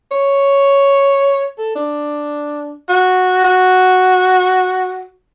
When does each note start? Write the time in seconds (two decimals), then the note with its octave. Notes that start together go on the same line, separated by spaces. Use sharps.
0.11 C#5
1.58 A4
1.75 D4
2.89 F#4
3.45 F#4